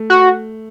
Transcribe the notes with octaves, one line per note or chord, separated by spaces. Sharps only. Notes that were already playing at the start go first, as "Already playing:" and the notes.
Already playing: A3
F#4